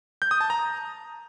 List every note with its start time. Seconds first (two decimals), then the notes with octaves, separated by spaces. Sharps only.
0.22 G6
0.31 D#6
0.40 A5
0.50 A#5